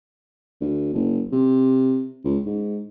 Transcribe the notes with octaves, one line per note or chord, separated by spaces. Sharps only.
D2
F#1
C3
C#2
G#2